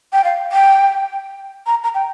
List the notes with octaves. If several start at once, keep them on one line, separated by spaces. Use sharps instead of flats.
G5
F5
G5
A#5
A#5
G5